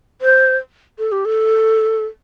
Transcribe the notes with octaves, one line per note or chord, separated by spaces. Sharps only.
C5
A4
G4
A4